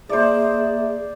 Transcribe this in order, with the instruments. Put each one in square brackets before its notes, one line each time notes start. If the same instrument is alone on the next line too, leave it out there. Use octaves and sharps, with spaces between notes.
[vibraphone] A#3 E5 [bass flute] G#4 [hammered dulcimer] C5 D5